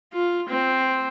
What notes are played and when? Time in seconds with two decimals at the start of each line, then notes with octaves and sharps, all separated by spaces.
0.13 F4
0.49 C4